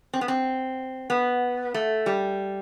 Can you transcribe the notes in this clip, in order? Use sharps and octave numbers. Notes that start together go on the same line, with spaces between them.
C4
B3
C4
B3
A3
G3